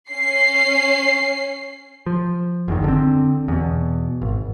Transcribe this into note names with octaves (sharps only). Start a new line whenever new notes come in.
C#4 C7
F3
F#1 E2 D#3
D3 C4
E2 B2
G#1